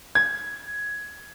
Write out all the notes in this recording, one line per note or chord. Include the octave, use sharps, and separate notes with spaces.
G#6